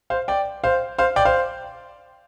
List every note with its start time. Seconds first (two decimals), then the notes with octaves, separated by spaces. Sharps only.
0.10 C5 F5
0.28 D5 G5
0.64 C5 F5
0.98 C5 F5
1.16 D5 G5
1.25 C5 F5